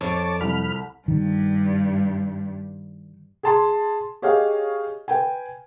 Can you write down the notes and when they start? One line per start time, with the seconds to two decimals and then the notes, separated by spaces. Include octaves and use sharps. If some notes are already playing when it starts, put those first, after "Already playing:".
0.01 F2 C#5 A5 D6
0.41 C2 B5 F6
1.08 G2 D#3
3.43 G#4 A5 C6
4.22 G4 G#4 C#5 D#5 F5 G#5
5.08 B4 G5 G#5